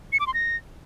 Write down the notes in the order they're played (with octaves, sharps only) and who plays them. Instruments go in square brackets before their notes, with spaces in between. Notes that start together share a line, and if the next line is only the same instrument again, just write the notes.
[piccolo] C#7
D6
C6
A#6